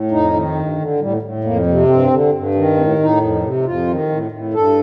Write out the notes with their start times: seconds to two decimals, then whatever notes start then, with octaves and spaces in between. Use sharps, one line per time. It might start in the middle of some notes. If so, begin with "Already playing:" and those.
Already playing: A2
0.11 F2 D#4
0.34 D#3
0.55 G2
0.78 D3
1.00 A2 G3
1.22 A2
1.44 F2 A#3
1.66 C3
1.88 G2 C4
2.10 D3
2.33 G2
2.55 D#3
2.77 A2 C4
2.99 A2 D#4
3.21 F2
3.43 C3
3.65 F2 F4
3.87 D#3
4.09 A2
4.32 A2
4.53 G2 A4